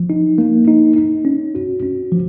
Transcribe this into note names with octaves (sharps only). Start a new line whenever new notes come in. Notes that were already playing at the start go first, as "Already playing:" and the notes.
Already playing: F3
D#4
A#3
D#4
D#4
C#4
F#4
C#4
F3